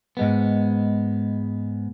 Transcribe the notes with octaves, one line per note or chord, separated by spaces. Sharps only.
G#2 G#3 B3